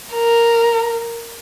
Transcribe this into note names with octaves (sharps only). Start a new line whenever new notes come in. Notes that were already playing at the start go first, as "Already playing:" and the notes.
A#4